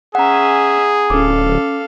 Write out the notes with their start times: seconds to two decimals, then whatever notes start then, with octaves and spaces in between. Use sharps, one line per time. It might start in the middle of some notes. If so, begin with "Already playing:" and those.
0.15 C#4 G#4 E5 F#5 A#5
1.10 D1 C#4 A4 F5 D6